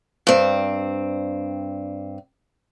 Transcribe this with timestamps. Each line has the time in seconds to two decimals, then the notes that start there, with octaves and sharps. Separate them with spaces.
0.27 G2 C4